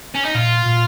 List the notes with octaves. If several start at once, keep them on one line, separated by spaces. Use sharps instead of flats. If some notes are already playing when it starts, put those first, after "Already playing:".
C#4
D#4
A#2 F4
A#2